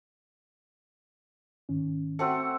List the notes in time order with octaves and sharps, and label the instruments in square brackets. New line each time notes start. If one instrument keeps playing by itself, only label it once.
[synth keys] G#2 D#3 C#4
[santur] A3 C4 F#4 [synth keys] C#7